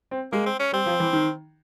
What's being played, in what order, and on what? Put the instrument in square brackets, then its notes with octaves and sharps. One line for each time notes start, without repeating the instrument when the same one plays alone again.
[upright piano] C4
[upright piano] G#3 [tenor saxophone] A#3
[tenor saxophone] C4
C#4
[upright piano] G3 [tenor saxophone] C4
[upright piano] F3
E3
D#3